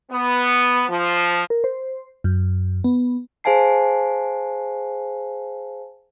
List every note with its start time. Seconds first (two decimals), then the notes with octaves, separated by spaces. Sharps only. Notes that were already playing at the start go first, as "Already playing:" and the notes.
0.11 B3
0.89 F3
1.50 A#4
1.64 C5
2.24 F#2
2.84 B3
3.44 G#4 C5 F5 G#5 A5 C7